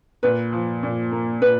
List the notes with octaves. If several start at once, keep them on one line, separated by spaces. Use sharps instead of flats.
A#2 B4
F3
A#2
A#3
A#2 B4